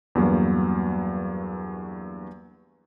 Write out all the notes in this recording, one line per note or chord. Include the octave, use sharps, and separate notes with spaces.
E2 G2 F#3 A#3 B3